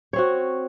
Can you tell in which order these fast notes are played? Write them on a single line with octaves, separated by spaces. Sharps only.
C#5 C4 F#4